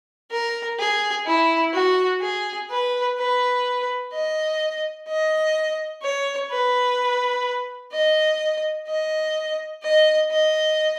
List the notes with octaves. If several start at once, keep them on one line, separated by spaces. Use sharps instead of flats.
A#4
G#4
E4
F#4
G#4
B4
B4
D#5
D#5
C#5
B4
D#5
D#5
D#5
D#5